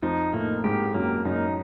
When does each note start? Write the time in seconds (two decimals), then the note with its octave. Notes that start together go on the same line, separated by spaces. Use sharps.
0.02 F2 F3 D#4
0.33 A2 A3 A#3
0.64 G#2 G#3 G4
0.94 F#2 F#3 A#3
1.25 F#2 F#3 D#4